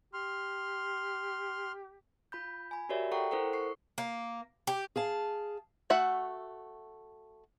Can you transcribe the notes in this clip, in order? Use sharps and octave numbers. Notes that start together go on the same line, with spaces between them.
G4 C6 F6
F4 B5 G6
G#5 B5
F#4 G4 A#4 C#5 D5 E5
A4 F#5 G5 A#5 C#6
E4 A4 A#4 C5 F#5
C#6 C7
A#3
G4
G#4 F5 A5
A3 F#4 E5 F#5